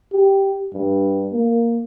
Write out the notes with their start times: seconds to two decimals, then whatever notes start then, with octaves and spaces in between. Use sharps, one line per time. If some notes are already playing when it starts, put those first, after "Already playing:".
0.13 G4
0.73 G2
1.32 A#3